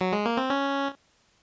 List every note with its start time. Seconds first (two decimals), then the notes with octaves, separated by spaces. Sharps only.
0.01 F#3
0.12 G#3
0.26 A#3
0.37 C4
0.50 C#4